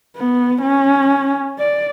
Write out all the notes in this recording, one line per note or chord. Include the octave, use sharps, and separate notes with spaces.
B3
C#4
D5